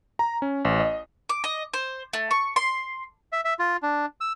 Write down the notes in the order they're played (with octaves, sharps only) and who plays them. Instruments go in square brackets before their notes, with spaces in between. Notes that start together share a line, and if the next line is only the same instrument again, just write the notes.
[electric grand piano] A#5
C#4
A1
D#5
[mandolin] D6
D#5
C5
A3
C#6
C6
[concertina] E5
E5
F4
D4
E6